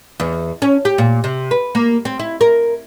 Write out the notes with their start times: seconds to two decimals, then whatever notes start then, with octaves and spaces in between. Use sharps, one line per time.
0.20 E2
0.62 C#4
0.85 G4
0.98 A#2
1.24 C3
1.51 B4
1.75 A#3
2.05 C4
2.19 E4
2.41 A#4